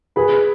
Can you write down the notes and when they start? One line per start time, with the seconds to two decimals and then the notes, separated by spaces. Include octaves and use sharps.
0.16 G#4 B4 B5